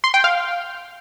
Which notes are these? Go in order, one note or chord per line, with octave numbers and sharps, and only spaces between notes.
C6
G5
F5